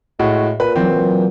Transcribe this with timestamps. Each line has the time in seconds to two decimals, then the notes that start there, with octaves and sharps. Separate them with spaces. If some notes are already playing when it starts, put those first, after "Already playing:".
0.19 A2 G#3 F#4
0.60 A#2 B4
0.76 E3 F#3 C4